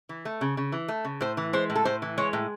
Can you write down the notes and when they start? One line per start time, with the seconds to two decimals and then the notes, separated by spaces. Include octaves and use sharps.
0.09 E3
0.25 A3
0.41 C#3
0.57 C#3
0.72 E3
0.88 A3
1.05 C#3
1.21 A2 C5
1.37 E3
1.53 G#3 C5
1.70 A2
1.75 A4
1.85 A2 C5
2.02 E3
2.18 G#3 C#5
2.33 A2